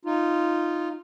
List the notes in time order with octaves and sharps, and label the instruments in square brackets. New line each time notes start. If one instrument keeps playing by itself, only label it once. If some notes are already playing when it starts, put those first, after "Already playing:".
[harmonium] D#4 F4